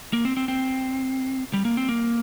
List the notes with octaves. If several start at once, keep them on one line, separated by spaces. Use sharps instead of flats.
A#3
C4
C4
C4
G3
A#3
C4
A#3